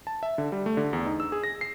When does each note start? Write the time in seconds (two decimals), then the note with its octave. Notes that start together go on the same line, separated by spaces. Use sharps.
0.07 A5
0.23 E5
0.38 D3
0.52 G3
0.66 A3
0.77 D3
0.93 E2
1.06 D#4
1.20 E6
1.32 G#4
1.44 A#6
1.61 C7